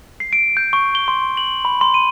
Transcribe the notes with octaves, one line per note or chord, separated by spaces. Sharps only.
C7
D7
G6
C#6
G7
C6
F#7
B5
C6
D#7